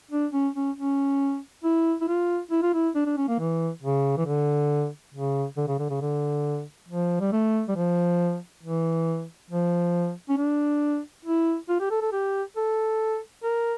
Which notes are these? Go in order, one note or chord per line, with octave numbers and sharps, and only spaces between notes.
D4
C#4
C#4
C#4
E4
E4
F4
E4
F4
E4
D4
D4
C#4
A#3
E3
C#3
E3
D3
C#3
D3
C#3
D3
C#3
D3
F3
G3
A3
G3
F3
E3
F3
C#4
D4
E4
F4
G4
A4
A4
G4
A4
A#4